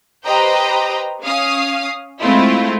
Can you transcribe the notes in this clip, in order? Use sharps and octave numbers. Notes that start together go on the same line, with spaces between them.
G4 B4 C5 D#5 G5 A#5
C#4 F5 D#6
G#3 A3 C4 E4 F4